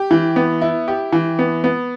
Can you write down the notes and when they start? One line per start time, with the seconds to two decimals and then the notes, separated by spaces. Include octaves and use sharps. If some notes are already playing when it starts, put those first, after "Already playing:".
Already playing: G4
0.11 E3
0.36 B3
0.61 E4
0.88 G4
1.12 E3
1.39 B3
1.64 B3